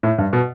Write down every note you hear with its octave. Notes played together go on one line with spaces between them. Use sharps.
A2
G2
B2